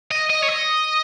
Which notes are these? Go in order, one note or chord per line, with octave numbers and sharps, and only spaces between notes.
D#5
D#5
C#5
D#5